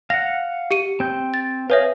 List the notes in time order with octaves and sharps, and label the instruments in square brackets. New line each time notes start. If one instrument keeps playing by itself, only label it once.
[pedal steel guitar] F5 F#5 [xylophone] A#6
[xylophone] G4 C#7 D#7
[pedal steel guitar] C4 G6
[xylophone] A6
[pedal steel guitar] G#4 F5 [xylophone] B4 C#5 E5